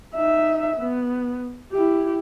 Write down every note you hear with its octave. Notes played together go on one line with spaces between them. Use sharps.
D#4 E5
B3
E4 G4